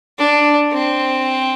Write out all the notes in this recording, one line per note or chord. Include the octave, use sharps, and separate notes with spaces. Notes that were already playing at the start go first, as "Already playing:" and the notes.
D4
C4